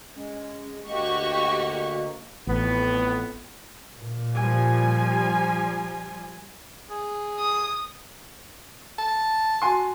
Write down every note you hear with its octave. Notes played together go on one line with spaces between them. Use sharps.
G#3 C#4
D2 A#3 F#4 G4 D#5 C#6
A1 F2 A2 B3
A#2
F3 G3 G#5
G#4
D#6
A5
F#4 G#5 C6